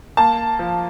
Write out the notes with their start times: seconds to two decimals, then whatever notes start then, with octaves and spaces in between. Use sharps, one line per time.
0.17 A#3 A5
0.59 F3